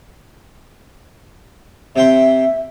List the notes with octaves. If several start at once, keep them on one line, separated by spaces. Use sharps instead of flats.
C3 E5 G5 C6